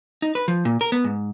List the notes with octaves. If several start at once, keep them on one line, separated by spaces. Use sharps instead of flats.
D#4
B4
F3
A#2
A#4
B3
G#2